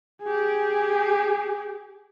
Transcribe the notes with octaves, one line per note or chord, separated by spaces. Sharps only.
G4 G#4